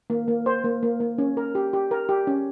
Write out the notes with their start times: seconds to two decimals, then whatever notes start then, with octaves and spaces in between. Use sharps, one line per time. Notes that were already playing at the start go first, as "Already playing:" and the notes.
0.10 A#3
0.28 A#3
0.46 C5
0.64 A#3
0.83 A#3
1.00 A#3
1.18 C#4
1.37 A#4
1.55 G4
1.73 G4
1.91 A#4
2.09 G4
2.27 C#4